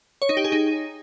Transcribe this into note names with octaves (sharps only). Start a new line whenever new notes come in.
C#5
D#4
G4
G#4
D#4